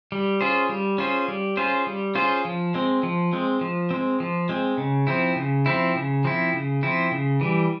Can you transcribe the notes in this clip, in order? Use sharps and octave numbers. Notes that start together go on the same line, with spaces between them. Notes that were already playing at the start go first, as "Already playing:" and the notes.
G3
C#4 F4 G#4 C5
G3
C#4 F4 G#4 C5
G3
C#4 F4 G#4 C5
G3
C#4 F4 G#4 C5
F3
G#3 C4
F3
G#3 C4
F3
G#3 C4
F3
G#3 C4
C#3
F3 C4 E4
C#3
F3 C4 E4
C#3
F3 C4 E4
C#3
F3 C4 E4
C#3
E3 G3